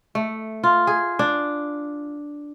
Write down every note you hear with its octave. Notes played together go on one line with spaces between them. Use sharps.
A3
F4
G#4
D4